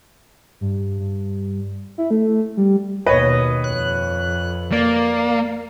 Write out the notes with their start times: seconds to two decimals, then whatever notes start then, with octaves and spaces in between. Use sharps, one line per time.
0.61 G2
0.99 G2
1.98 E4
2.11 A3
2.57 G3
3.06 D#2 B2 B4 C#5 D#5
3.64 F2 F#6
4.72 A#3 D5